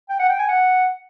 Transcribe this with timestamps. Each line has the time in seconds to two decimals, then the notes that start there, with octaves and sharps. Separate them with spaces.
0.10 G5
0.19 F#5
0.29 G5
0.39 G#5
0.49 F#5